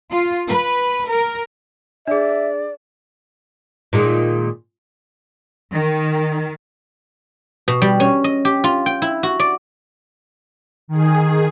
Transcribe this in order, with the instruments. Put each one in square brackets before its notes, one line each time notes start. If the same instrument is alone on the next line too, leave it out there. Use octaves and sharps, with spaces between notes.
[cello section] F4
B4
A#4
[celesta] D4 G#4 [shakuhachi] D5 [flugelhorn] E5
[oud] A#2 D#3 G#3
[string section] D#3
[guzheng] B2
G3
C#4
D#5
G4
F4
G5
E4
F#4
D5
[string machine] D#3 G#4